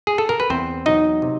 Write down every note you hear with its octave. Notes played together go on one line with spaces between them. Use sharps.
G#4
A4
A#4
B4
E2 C4 C5
F#3 D#4 D#5
C3